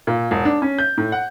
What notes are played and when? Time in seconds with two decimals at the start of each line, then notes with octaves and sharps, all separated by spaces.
0.07 A#2
0.31 E1
0.45 D4
0.62 C#4
0.79 G6
0.97 A2
1.12 F#5